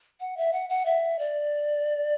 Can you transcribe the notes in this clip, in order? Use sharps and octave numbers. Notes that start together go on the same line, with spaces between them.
F#5
E5
F#5
F#5
E5
D5